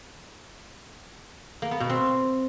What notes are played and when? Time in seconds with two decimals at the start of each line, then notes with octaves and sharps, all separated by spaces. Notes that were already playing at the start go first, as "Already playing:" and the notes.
1.62 A#3
1.71 B3
1.80 B2
1.90 C4